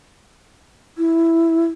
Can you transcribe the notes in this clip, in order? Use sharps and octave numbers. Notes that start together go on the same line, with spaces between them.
E4